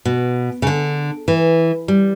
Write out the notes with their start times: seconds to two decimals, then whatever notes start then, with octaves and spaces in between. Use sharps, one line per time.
0.05 B2
0.62 C#3
0.67 D3
1.28 E3
1.88 G3